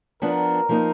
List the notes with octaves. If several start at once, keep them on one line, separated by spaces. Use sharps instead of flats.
F3 B3 D4 A#4
F3 A#3 D#4